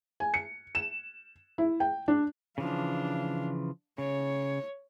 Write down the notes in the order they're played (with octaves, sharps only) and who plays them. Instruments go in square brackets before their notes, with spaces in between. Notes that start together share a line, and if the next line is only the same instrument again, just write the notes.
[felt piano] G#5
C#7
E7
E4
G5
D4
[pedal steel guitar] C#3 E3 F3 [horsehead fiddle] D4 F5
[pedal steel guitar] C#3 [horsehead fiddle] C#5